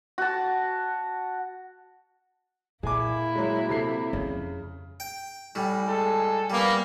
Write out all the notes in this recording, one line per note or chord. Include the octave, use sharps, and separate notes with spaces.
F#4 A5
A#2 A#3 E4 G#4 G#5 D6
F#3 G#3
C3 A4 C7
F2 C#3
G5
A2 G3 G#5
G#3 A4
G3 A#3 B3 B5